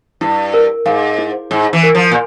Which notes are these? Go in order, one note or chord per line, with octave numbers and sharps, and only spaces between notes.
G2 E4
A#4
G#2 F5
E4
G#2 E4
E3
A#4
F3
A#2